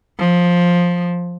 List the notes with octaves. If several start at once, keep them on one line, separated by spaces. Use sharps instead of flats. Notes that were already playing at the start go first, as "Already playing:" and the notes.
F3